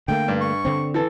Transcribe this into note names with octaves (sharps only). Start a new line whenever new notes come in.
D3 A3 A#3 G5
G2
C#6
D3 C4
E3 A4